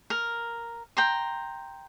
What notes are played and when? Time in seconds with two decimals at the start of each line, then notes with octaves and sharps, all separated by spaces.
0.10 A#4
0.97 G5 A#5 C6